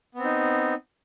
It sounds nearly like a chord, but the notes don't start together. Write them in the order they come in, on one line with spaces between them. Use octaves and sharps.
B3 C4 D#4